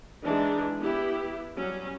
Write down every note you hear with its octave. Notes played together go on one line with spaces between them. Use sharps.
E3 G#3 D4 D#4
B3 E4 G4
F#3 G3 C#4